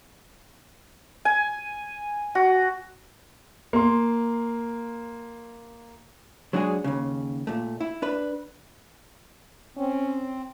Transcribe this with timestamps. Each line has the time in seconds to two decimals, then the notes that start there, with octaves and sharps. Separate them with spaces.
1.25 G#5
2.35 F#4
3.73 A#3 C6
6.53 F#3 G#3 D4 F#4 G#4
6.84 D#2 C#3
7.47 A#2 A3
7.80 E4
8.02 D4 B4
9.77 C4 C#4